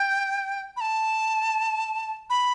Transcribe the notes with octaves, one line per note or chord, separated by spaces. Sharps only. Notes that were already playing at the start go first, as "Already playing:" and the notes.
Already playing: G5
B5
A5
B5